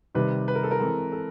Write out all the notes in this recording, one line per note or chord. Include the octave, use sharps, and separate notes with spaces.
C3 D#3 G3 B4
B4
A#4
A4
A#4
E3 G#3 C4 A4
A4